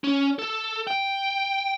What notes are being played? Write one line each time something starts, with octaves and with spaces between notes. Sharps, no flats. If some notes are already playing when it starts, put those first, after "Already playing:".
C#4
A4
G5